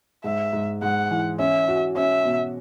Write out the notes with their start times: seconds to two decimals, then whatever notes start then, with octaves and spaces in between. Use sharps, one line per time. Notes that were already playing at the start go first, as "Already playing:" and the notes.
0.24 G#2 E5
0.53 G#2
0.82 G#2 F#5
1.11 E3
1.39 C#4 E5
1.68 F#4
1.96 C#4 E5
2.25 B2